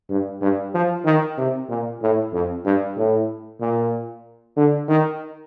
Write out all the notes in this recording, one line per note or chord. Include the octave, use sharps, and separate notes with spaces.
G2
G2
F3
D#3
C3
A#2
A2
F2
G2
A2
A#2
D3
D#3